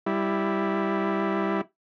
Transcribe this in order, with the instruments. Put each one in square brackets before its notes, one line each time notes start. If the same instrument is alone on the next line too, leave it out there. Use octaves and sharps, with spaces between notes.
[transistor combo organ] G3 E4